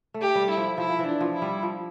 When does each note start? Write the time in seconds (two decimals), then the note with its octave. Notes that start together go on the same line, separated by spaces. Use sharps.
0.14 A3
0.21 G4
0.35 G3
0.50 E4
0.57 F3
0.78 F3 E4
0.90 F3
0.99 E3
1.06 D4
1.21 F3
1.34 E4
1.42 G3
1.63 F3